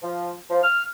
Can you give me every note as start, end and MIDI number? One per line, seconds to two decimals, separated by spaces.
0.02 0.32 53
0.50 0.59 53
0.63 0.83 89